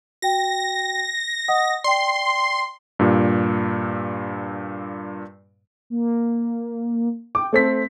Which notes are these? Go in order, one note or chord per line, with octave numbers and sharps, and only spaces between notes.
F#4 G5 A#6
D#5 F#5 D#6
D5 G5 C6
G2 A#2
A#3
G5 D6
A3 C4 A4 B6